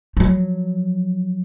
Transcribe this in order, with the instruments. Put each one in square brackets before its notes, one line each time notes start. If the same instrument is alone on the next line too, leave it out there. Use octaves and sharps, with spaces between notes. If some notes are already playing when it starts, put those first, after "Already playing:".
[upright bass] F3 F#3